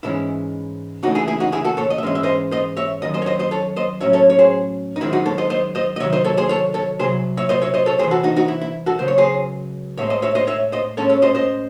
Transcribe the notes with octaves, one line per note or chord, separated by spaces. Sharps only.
G#2 E3 G#3 C#4 E4
C#2 C#3 E3 A3 D#4 F#4
E4 G#4
E4 G#4
D#4 F#4
E4 G#4
F#4 A4
A4 C#5
D#5
E5
G#2 E3 G#3 C#4 D#5
E5
C5 D#5
C5 D#5
C#5 E5
F#2 D#3 D#5
C5 D#5
C#5
C5 D#5
C5 D#5
A4 C#5
C5 D#5
A2 F#3 C#4 C#5 E5
A4 C#5
C#5
G#4 C5
D#4
F#2 D#3 G#3 C4 E4
D#4 F#4
A4 C#5
C5 D#5
C5 D#5
C5 D#5
D#5
C3 D#3 F#3 C#5 E5
C5 D#5
A4 C#5
G#4 C5
A4 C#5
A4 C#5
C2 C3 F#3 G#4 C5
C#5 E5
C5 D#5
C#5 E5
C5 D#5
A4 C#5
C2 C3 E3 G#4 C5
F#4 A4
D#4 F#4
D#4 F#4
E4
E4
F#4 A4
C#2 C#3 F#3 C5
C#5
G#4 C5
A2 G#3 C4 C#5 E5
C5 D#5
C#5 E5
C5 D#5
C#5 E5
C5 D#5
A2 G#3 C#4 A4 C#5
A4 C#5
C5 D#5
C5 D#5